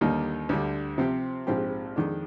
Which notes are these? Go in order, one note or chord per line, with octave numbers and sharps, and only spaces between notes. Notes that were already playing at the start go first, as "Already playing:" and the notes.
D#2 D3 G3 A#3 D#4
D2 D3 G3
C3 F3 C4 G4
A#1 G#2 F3 C4 G4
F2 D#3 G#3 D4